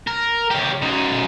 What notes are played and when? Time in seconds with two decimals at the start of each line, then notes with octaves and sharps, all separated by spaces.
0.07 A#4
0.50 C#3 G4
0.82 F#2 D#4